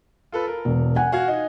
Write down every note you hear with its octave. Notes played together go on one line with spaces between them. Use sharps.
F4 A4 B4
A#4
E1
F#5 G#5
F#4 F5 G#6
D#4